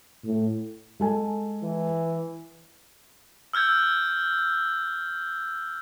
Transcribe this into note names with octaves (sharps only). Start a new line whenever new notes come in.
A2
G#3 A4 G#5
E3
E6 F6 G6 G#6